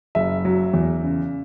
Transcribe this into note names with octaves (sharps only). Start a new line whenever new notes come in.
F#1 E5
F#3
E2
C#3